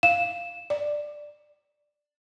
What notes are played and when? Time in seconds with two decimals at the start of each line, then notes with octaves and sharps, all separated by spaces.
0.03 F5 E7
0.70 D5